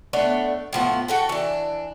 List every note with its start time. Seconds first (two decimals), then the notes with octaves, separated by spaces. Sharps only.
0.13 A3 B3 D4 C#5
0.73 A2 F3 B3
1.08 F#4 A4 G5
1.29 E3 D4